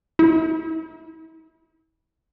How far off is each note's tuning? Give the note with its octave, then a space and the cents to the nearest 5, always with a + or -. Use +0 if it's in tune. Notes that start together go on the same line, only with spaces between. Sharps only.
E4 -30